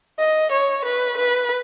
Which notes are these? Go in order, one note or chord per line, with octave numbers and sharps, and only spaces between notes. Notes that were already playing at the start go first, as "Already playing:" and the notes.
D#5
C#5
B4
B4